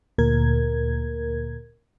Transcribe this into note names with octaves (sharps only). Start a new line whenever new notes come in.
D2 A#2 A#4 G#6